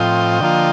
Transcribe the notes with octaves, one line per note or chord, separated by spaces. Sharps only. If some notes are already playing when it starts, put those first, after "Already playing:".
Already playing: A2 F3 C4 F4 D#5 G5
D3 F3 A#3 F4